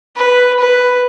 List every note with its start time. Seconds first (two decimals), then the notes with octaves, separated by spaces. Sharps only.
0.17 B4
0.60 B4